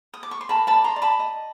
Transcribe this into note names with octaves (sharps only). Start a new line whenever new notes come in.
D#6
D6
C#6
C6
A#4 A5 B5
A5 B5
D5
A#5 C6
D5
A5 B5
D#5